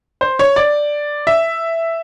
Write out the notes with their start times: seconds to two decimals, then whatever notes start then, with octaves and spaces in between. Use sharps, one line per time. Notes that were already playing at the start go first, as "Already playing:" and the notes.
0.21 C5
0.39 C#5
0.56 D5
1.27 E5